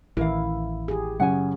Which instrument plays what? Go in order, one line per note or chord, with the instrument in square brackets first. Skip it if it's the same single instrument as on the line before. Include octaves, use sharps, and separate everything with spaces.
[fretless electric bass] A1 D#3 E3 [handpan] E4 [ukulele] A#4 F5
[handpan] G4 G#4
[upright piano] F#2 C#3 C#4 [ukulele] F#5 G#5